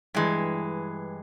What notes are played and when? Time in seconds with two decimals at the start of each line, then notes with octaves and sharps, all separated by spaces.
0.15 G2 E3 G#3